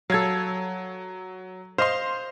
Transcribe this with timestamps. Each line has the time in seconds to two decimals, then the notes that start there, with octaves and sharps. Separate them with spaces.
0.10 F#3 A4 F5 G#6
1.78 C5 D#5 F5 C6